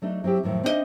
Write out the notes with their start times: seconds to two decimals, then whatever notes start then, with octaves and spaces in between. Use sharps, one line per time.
0.02 F#3 A3 D4 D#4
0.24 F#3 C4 E4 G4
0.44 F2 A2 D#3 F#3
0.63 C4 D4 D#4 G4 D#5 E5